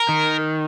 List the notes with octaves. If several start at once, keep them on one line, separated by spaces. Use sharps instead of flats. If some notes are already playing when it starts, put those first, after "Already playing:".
Already playing: A#4
D#3